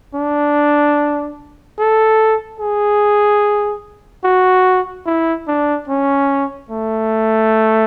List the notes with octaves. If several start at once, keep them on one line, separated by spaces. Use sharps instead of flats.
D4
A4
G#4
F#4
E4
D4
C#4
A3